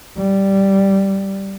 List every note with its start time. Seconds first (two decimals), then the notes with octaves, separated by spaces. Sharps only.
0.17 G3